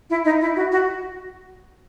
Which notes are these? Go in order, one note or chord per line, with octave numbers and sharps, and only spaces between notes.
E4
D#4
E4
F#4
F#4